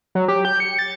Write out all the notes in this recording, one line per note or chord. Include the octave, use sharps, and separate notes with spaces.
F#3
G4
G6
C#7
A6